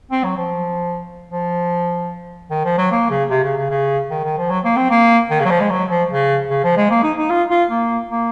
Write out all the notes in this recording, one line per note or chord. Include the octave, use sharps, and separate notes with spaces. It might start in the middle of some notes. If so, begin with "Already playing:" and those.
C4
F#3
F3
F3
D#3
F3
F#3
A#3
C#3
C3
C#3
C#3
C#3
D#3
D#3
F3
F#3
A#3
C4
A#3
D#3
C#3
F#3
F3
G#3
F#3
F3
C#3
C#3
F3
G#3
A#3
D#4
D#4
F4
F4
A#3
A#3